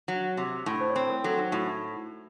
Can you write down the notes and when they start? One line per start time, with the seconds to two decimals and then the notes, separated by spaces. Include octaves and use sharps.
0.08 F#3
0.37 C3
0.66 A2
0.80 C5
0.90 C#5
0.95 C4 C5
1.10 A#4
1.24 F#3 A4
1.38 D#4
1.52 A2 F#4